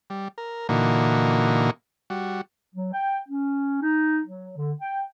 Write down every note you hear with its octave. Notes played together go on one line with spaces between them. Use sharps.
G3
A#4
A#2 D3 E3 A#3 D#4 F#4
G3 F#4
F#3
G5
C#4
D#4
F#3
D3
G5